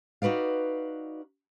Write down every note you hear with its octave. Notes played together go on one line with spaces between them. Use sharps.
D#4 F#4 B4 D5 F5